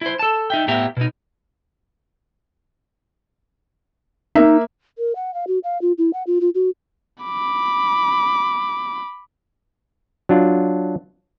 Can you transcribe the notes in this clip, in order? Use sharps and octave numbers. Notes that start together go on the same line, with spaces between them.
E4 C5
A4 A5
D#4 E5 G5
A2 B3 G4 E5 A#5
B2 D#4
A#3 D#4 E5
A#4
F#5
F5
F#4
F5
F4
E4
F#5
F4
F4
F#4
B5 D6
F#3 D4 F4